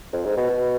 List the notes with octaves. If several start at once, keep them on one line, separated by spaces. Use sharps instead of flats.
F2
G#2
B2
B2